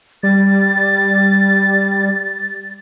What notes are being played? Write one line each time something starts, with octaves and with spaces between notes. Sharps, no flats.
G3 A6